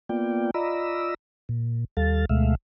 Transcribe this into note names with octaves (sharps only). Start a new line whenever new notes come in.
A#3 B3 F4 D5 G5
F4 D5 D#5 A#5 B5 E6
A#2
D#2 G3 A4 F5 A6
D2 B2 G#3 A3 E5 F5